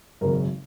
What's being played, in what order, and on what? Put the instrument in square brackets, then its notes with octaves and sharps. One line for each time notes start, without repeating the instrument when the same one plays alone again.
[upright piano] G#1 F#2 C#3 A#4